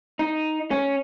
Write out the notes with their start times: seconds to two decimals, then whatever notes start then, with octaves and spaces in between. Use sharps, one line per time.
0.19 D#4
0.71 C#4